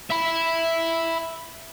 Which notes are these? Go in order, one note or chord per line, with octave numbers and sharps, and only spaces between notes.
E5 B5